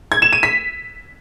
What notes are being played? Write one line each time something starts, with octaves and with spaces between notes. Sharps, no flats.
G#6
E7
D#7
B6